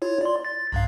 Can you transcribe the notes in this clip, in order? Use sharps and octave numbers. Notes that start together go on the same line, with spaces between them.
E4 F4 C#5
D5 C6
A6
B1 G2 F5